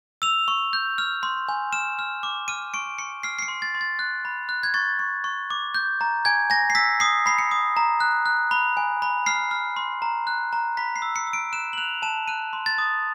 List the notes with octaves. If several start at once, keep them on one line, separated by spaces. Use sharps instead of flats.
E6 F7
C#6
G6
F6
C6
G#5
F6 E7
F6
D6
F6 D#7
C#6 D7
C#6 C#7
F6 C7
C7
C#7
C6
A6
C6
A6
F#6
B5
F#6
G#6
C#6 A6
C#6
C#6
D6
G6
A#5
G#5 G#6
G#5 A#6
C7
E6 B6
D#6 C7
B5 C7
C#7
D#6
A#5
F#6
F#6
B5
G#5
B5
F6 C7
F6
C6
A#5
F#6
A#5
B5 B6
C7
E6
C#7
E6
D7
F#6 E7
F#7
F#6 F7
A5 E7
F#6 D#7
C6
A6
D#6